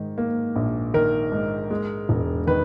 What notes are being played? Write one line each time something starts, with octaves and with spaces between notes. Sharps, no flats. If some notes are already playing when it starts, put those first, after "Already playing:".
Already playing: G#2 D#3
A#3
A#1
D#3 A#4
G#2
G#3
E1
D#3 B4